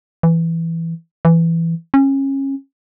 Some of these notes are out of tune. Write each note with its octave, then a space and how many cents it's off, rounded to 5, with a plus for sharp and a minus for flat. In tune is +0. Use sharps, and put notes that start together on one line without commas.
E3 +5
E3 +10
C#4 -25